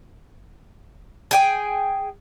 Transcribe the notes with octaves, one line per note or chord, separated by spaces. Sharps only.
G#4 G5 G#5